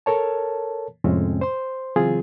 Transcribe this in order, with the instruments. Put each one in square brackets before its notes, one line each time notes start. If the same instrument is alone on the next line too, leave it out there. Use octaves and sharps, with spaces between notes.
[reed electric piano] A4 A#4 C#5 A5
F2 A2 C3 G#3 C4 C#4
C5 C6
C#3 E3 F#3 C4 F4 G#4